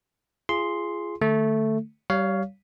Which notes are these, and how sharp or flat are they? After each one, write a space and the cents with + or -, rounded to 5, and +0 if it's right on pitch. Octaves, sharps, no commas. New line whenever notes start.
F4 -30 G#4 +0 C6 +0
D3 +25 A3 +0
G3 -20 C#5 +20 F5 +0